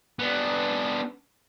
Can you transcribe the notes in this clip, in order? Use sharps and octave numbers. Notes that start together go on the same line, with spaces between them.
B3 D4